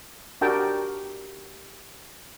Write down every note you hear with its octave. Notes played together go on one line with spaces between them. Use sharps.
D4 F#4 G4 A#4 G5 A5